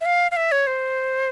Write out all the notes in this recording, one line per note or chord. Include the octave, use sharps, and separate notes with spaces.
E5
F5
F5
E5
C#5
C5